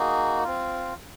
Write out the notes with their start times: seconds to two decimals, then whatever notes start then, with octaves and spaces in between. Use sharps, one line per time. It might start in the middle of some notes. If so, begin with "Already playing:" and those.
Already playing: A#3 D#4 F#4 G#4
0.44 C4 F4